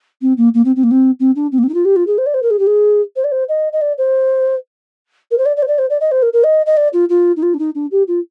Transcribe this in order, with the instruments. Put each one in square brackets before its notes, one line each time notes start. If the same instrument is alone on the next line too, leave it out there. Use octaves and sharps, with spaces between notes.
[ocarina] C4
A#3
A#3
C4
C4
A#3
C4
C4
D4
C4
A#3
C4
D#4
F4
G4
F4
G#4
C5
D5
C5
A#4
G#4
G4
G#4
C5
D5
C5
D#5
D#5
D5
C5
A#4
C5
D5
D5
C5
D5
C5
D5
D#5
C5
A#4
A#4
D#5
D#5
D5
F4
F4
D#4
F4
D4
D#4
D4
G4
F4